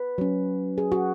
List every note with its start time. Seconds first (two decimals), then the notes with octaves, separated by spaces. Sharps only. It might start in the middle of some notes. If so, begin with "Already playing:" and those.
Already playing: B4
0.18 F#3 C#4
0.78 G#4
0.92 F#4